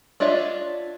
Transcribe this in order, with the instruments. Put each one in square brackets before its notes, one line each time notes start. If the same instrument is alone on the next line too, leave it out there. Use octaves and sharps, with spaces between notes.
[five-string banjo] D4 F4 C#5 D#5 E5